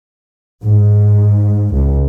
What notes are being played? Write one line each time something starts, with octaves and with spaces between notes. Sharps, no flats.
G#2
C#2